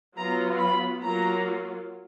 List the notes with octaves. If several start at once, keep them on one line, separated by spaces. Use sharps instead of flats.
F#3 B3 F4 A#5
B5
F#3 A#3 F4 A#5